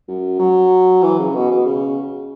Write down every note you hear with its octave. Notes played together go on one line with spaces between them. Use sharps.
F#2
F#3
E3
C#3
B2
B2
C#3